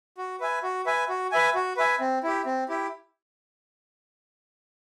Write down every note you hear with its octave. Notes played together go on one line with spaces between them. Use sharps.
F#4
B4 E5 G#5
F#4
B4 E5 G#5
F#4
B4 E5 G#5
F#4
B4 E5 G#5
C4
E4 G4
C4
E4 G4